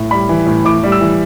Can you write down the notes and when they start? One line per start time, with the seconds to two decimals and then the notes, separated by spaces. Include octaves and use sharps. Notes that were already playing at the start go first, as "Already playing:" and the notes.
Already playing: A2
0.11 G3 B5
0.29 E3
0.46 A2
0.65 A2 D6
0.83 G3
0.92 E6
1.01 E3